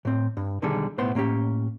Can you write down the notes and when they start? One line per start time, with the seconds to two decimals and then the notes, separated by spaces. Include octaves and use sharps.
0.05 A2 C4
0.37 G2
0.62 B1 D3 D#3 G3 G#4 A4
0.98 B1 A2 B3 C5 C6
1.15 A2 A#3 C#4 G4